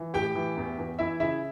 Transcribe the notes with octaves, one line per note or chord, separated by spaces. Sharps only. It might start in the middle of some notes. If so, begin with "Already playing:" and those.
Already playing: E3
A2 G4 G5
E3
E2
E2
E3 E4 E5
C#3 E4 E5